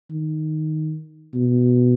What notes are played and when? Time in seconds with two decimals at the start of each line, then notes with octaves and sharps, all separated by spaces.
0.10 D#3
1.35 B2